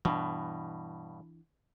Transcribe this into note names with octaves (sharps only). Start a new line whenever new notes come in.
G2 B2 E3 D4